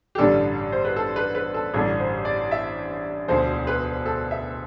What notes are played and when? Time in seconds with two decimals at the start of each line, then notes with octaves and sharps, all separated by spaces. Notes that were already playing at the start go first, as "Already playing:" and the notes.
0.15 G4
0.18 A1 G2 D3 G3 D4 A4
0.72 C5
0.85 B4
0.96 A4
1.16 B4
1.35 B4
1.54 A4
1.74 A1 G2 D3 G3 D4 A4
1.99 C5
2.25 D5
2.51 E5
3.28 E1 D2 D3 F3 C5
3.67 B4
4.06 A4
4.31 E5